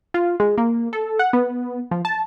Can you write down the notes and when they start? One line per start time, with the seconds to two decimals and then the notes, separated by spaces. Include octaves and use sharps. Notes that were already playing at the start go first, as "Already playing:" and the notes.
0.14 F4
0.40 G#3
0.58 A#3
0.93 A4
1.19 F#5
1.33 B3
1.91 F3
2.05 A5